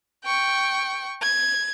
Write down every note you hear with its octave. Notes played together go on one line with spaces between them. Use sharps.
G5 C#6
G#6